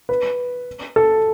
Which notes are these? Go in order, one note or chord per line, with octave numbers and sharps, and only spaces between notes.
B4
A4